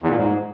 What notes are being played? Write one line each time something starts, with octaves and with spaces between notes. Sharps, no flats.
E2
A#2
G#2